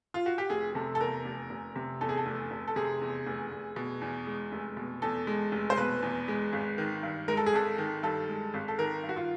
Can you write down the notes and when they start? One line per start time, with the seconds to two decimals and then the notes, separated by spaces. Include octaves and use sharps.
0.14 F4
0.26 F#4
0.38 G4
0.50 F1 G#4
0.75 C3 A4
0.95 A4
1.00 E2 A#4
1.25 F1
1.50 F1
1.76 C3
2.01 E2 A4
2.09 G#4
2.17 A4
2.26 F1
2.51 F1
2.68 A4
2.76 C3 G#4
3.01 E2
3.27 F1
3.52 F1
3.76 B2
4.01 E2
4.27 G#3
4.52 F1
4.77 B2
5.02 E2 A4
5.27 G#3
5.52 F1
5.70 C5
5.77 B2 B4
6.03 E2
6.28 G#3
6.53 G#1
6.78 D#3
7.03 G2
7.28 G#3 A#4
7.37 A4
7.46 G#4
7.53 G#1 A4
7.78 D#3
8.03 G2 A4
8.29 G#3
8.54 G#1
8.68 A4
8.79 D#3 A#4
9.04 G2
9.09 F#4
9.16 F4